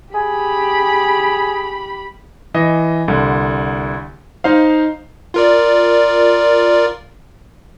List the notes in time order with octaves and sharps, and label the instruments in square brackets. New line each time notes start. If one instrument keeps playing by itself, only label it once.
[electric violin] G4 B5 [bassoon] G#4
[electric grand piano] E3 D#5
C2 D3
D#4 C5 F5
[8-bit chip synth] F4 A#4 D5